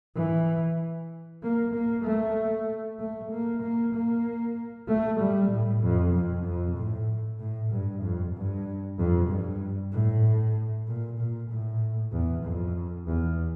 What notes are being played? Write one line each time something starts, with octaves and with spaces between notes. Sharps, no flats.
E3
A#3
A#3
A3
A3
A#3
A#3
A#3
A3
G3
A2
F2
F2
F2
A2
A2
G2
F2
G2
F2
G2
A2
A#2
A#2
A2
E2
F2
E2